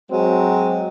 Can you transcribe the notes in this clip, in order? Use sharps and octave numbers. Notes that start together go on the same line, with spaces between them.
F#3 G#3 C4